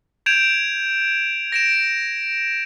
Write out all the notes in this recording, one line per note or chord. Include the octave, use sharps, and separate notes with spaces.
G6 G#6 D7 E7 F7
A#6 D7 E7